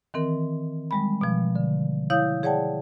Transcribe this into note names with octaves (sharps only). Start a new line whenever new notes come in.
D#3 E3 C4 A#4
G3 G#3 B5
B2 F3
D3
E4 C#5 F5 D#6 G6
G#4 C#5 D5 F#5 G5 A5